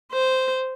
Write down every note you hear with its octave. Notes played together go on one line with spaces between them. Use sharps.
C5